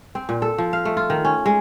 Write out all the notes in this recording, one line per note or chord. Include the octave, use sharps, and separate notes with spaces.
C4
A#2
A4
F3
F5
A3
F4
D#3
C#4
G#3